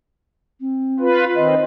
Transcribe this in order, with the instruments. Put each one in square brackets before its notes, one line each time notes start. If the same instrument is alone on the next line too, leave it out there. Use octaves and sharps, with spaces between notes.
[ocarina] C4
[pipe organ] F4 B4
[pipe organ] D#3 C4 [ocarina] D#5